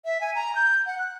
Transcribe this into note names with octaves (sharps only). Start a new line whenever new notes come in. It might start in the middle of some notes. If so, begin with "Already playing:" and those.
E5
G#5
A#5
G6
F#5
F#6